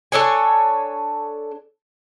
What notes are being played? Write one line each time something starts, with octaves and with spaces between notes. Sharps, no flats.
D4 A4 C#5 G#5